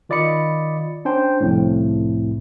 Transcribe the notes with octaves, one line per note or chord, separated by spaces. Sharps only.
D#3 F4 D5 D#5 B5 C#7
C#4 D4 C5 G5
C2 F2 A2